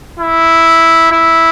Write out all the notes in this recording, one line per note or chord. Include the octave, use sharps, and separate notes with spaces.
E4
E4